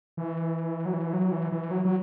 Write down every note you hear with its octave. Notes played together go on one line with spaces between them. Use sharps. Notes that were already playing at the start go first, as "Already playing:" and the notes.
E3
F#3
E3
F#3
E3
E3
F#3
F#3